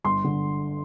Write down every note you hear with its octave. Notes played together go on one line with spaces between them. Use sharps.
G1 C6
D3